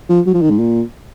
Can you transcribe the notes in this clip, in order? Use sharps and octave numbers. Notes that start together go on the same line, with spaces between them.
F3
F#3
F3
D#3
G#2
A#2